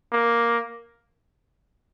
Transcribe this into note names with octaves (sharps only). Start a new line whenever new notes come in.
A#3